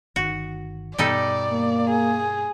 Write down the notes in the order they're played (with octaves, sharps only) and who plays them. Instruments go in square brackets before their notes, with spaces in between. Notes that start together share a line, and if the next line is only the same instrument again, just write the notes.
[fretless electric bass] G1 D#3 [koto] F#4
[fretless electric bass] G2 B2 B3 [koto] G3 D#4 A4 [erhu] D5
[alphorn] A#3
[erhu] G#4